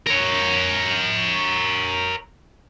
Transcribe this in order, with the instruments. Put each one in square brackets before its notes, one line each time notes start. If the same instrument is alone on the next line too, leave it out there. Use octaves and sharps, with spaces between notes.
[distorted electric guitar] A#4 C#5